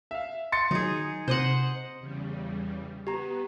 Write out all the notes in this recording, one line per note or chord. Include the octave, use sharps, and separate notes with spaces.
E5 F5
C6 A6 C#7
D#3 F#3 D#4 G#4
C3 C5 D#5 F#5
E2 C#3 G3
B3 G4 A#5